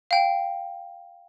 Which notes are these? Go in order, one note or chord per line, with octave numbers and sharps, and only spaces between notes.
F5 G5